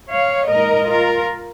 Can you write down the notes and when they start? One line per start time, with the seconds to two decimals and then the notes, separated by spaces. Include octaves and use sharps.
0.11 C#5 F5
0.48 A#2 G#3 D#4 A#4 D#5
0.86 F4 A#4